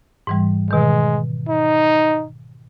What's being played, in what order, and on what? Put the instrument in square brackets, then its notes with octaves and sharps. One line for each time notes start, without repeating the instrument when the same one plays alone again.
[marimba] G#2 E3 G3
[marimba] B2 D#3 [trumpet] G#3
[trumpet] D#4